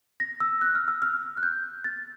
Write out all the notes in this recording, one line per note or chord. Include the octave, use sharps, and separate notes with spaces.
A#6
E6
F#6
F6
E6
F6
F#6
G6
A6